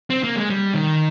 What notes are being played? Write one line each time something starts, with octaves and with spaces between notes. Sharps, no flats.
C4
A#3
G#3
G3
D#3